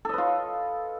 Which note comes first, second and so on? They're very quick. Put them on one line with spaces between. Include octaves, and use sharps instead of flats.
A4 D#5 B4 F4